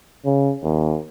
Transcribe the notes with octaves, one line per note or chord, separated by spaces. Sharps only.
C#3
D#2